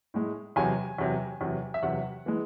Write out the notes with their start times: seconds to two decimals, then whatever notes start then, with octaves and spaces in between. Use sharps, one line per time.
0.14 A2 G#3
0.56 E2 C3 F#3 G#5
0.98 E2 C3 F#3
1.41 E2 C3 F#3
1.74 E5
1.83 E2 C3 F#3 F#5
2.26 E3 G#3